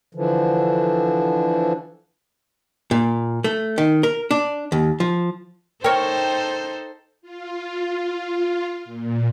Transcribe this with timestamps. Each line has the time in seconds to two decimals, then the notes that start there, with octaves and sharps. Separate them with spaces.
0.15 D3 E3 F3
2.91 A#2
3.44 A3
3.78 D#3
4.03 A#4
4.31 D4
4.72 D#2
5.00 F3
5.84 D#4 A4 A#4 C5 C#5 G5
7.22 F4
8.85 A#2